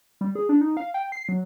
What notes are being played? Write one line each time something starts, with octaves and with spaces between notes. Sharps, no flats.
G3
G#4
D4
D#4
F5
G5
C7
F#3